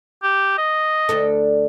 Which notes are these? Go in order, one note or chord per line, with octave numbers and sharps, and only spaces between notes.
G4
D#5
D2 D4 A4